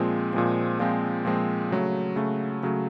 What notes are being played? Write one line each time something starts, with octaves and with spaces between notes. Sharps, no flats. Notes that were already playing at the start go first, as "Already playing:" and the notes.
Already playing: A#2 F3 G#3 C4
A#2 F3 G#3 C4
A#2 F3 G#3 C4
A#2 F3 G#3 C4
C#3 F#3 A3
C#3 F#3 A3
C#3 F#3 A3